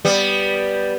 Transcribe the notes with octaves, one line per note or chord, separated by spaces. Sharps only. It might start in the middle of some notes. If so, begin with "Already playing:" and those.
G3 B3